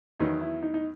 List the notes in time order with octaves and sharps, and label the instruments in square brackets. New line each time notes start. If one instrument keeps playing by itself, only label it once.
[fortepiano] E2 D#3 F#3 B3 [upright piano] D#4
[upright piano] E4
D#4
D#4